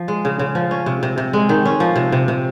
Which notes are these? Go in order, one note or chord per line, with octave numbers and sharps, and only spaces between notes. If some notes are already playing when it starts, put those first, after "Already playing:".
Already playing: F3
G#3
C#3
C#3
F3
C#4
C3
C3
C3
G#3
D#3
C#4
F3
C3
C3
C3